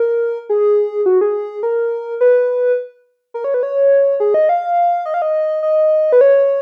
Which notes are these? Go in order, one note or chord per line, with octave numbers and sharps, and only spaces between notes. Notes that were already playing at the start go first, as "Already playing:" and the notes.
Already playing: A#4
G#4
F#4
G#4
A#4
B4
A#4
C#5
B4
C#5
G#4
D#5
F5
D#5
F5
D#5
D#5
B4
C#5